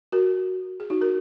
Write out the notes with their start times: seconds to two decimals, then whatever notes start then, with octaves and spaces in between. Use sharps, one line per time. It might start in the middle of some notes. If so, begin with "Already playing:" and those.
0.12 F#4 A#4
0.80 G#4
0.90 D#4 F#4
1.01 F#4 A#4